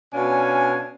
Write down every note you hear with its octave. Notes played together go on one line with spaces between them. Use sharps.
B2 C#4 D4 F5 G#5